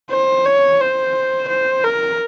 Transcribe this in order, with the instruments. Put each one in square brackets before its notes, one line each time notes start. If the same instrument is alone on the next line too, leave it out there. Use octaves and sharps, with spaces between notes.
[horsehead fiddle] C5
C#5
C5
C5
A#4